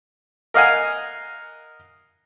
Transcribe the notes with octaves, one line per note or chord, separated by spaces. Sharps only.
A#4 D#5 F5 F#5 G#5